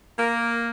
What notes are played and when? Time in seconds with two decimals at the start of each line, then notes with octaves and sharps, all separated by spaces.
0.18 A#3